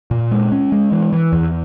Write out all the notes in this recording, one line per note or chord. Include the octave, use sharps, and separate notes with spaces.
A#2
G#3
C#4
G#3
E3
E3
E2